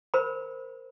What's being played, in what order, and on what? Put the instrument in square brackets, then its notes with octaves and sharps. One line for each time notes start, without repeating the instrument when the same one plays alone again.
[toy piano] A#4 C5 B5